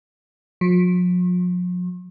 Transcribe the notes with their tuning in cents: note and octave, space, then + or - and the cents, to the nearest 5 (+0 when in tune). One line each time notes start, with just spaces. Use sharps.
F3 +45